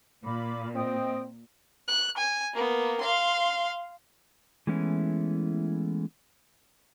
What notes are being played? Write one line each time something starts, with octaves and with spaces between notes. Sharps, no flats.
A#2 F4 B5 D6
C4 D#5 G5 D#6
F#6
G#5
A#3 B3
F5 C6
E3 G#3 A3 B3 C#4 E4